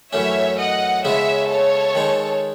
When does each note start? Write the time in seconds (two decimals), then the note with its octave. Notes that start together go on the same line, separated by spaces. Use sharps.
0.13 F#2 E3 A3 C#4 C#5 E5
0.59 D#5 F#5
1.05 C#3 G#3 B3 E4 C#5 E5
1.50 A4 C#5
1.95 D#3 G#3 D#4